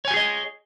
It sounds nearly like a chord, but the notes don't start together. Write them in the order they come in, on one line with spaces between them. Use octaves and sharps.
C#5 G#5 G4 G#4 D#5